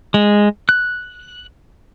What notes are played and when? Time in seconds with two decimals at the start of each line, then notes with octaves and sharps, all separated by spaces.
0.14 G#3
0.69 F#6